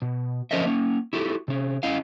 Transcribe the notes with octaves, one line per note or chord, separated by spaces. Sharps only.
B2
F3 C#4 A#4 C5 D#5 E5
A#3 C#4
E4 F#4 G4 A4
C3 C#4
C#4 E4 D#5 F5